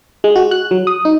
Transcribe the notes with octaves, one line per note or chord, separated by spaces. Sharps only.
G#3
F#4
F#6
F#3
D#6
D#4